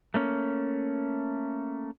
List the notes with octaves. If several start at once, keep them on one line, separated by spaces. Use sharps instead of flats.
A3 A#3 C#4